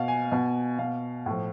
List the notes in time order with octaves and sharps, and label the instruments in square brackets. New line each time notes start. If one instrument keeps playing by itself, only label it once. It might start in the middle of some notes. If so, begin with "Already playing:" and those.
Already playing: [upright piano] B2 F5
G#5
B2
B2 F5
A2 F3